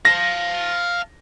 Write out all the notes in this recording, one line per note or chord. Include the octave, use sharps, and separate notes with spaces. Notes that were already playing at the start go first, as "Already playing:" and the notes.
F5 A5 A#6